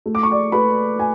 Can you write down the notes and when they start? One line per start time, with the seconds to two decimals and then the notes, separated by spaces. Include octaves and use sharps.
0.06 A3
0.15 D6
0.23 C#6
0.31 D5 D6
0.52 A3 B4 B5
0.99 G#5